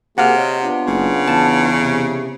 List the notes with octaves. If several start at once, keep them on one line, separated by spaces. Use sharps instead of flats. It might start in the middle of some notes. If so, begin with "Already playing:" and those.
C3 A#3 F#4 G#4 F5 F#5
C#5 D#5
B3 D4 F4
F#1 C#3
E2 A5
C3